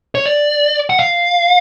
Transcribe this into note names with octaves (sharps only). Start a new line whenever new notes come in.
C#5
D5
F#5
F5